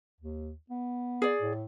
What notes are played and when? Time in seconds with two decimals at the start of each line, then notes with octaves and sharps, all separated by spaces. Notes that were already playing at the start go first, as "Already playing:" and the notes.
0.20 D#2
0.70 B3
1.22 G#4 D5
1.41 A2